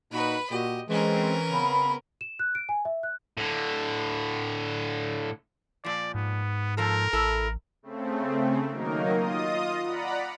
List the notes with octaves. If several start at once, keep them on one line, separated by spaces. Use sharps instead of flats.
A#2 D#4 F#4 B4 B5
A#2 F#4 G4 D#5
E3 G#3 C4 C#4 A#4
C#3 B3 C4 B5
E7
F#6
D7
G#5
E5
F#6
A2 D3
A#2 F3 D5
G#2 B3
F2 F3 A4 A#4
A1 E4 A4
C#3 A3 C4
D#3 F#3 A#3 D#4 A#4
F4 D#5 D#6
D5 F#5 A#5 B5